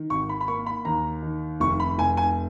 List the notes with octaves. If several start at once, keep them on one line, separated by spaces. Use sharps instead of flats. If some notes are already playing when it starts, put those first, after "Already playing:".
Already playing: D#3
G#1 C#6
B5
B5
A#3 C#6
B5
D#2 A#5
D#3
F1 C#6
B5
F1 G#5
G#5